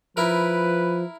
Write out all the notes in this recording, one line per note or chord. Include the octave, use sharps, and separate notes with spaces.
F3 E4 A#4 B4